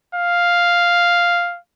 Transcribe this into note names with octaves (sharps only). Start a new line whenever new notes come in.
F5